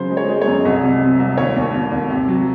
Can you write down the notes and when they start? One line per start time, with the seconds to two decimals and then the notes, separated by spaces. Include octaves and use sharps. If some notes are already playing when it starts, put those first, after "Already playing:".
Already playing: C#3 F#3 C5
0.10 G#3
0.17 C#5
0.28 G#3
0.42 C#5
0.47 F#2
0.65 C2 D#5
0.83 C3
1.01 C3
1.20 C2
1.37 D#2 C#5
1.56 D#2
1.74 D#2
1.92 D#2
2.10 C3
2.28 F#3